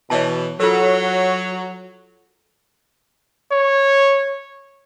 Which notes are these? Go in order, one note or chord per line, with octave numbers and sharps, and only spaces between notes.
B2 E3 C#5 A5
F#3 F4 A4 A#4
C#5